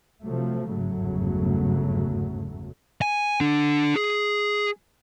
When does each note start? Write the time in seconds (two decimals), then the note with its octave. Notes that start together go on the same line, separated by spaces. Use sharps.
0.22 C3 F3 F#3 A3
0.75 G1 E2 G#2 C#3 F#3 A3
3.02 G#5
3.41 D4 A4
3.96 G#4